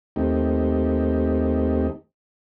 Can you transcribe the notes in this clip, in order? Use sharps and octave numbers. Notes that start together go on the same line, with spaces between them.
D#2 A3 C4 D#4 G4